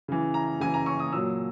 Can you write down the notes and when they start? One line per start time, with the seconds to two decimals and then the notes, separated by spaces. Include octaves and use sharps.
0.08 C#3 E3
0.34 A#5
0.60 C#3 E3 G#5
0.74 A#5
0.86 C#6
0.99 D#6
1.12 A#2 F#3 E6